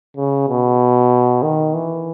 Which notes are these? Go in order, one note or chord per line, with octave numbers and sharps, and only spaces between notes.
C#3
B2
D#3
E3